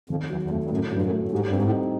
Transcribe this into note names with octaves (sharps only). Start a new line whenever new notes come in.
F2 D#3
E2 F#3
E2
F2 A3
G2
F#2 A2
G2 F#3
F#2
A3
G#2 G3
G2
G#2 C4
A2
D#4